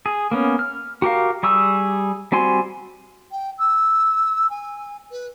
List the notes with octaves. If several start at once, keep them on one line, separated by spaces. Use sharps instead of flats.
G#4
A#3 B3 C#4
F6
F#4 G4 A#4 F5
G3 G#4 C#6 E6
G3 C4 F#4 G#5 C6
G5
E6
G#5
B4